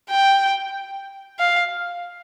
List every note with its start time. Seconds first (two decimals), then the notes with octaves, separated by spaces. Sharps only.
0.10 G5
1.39 F5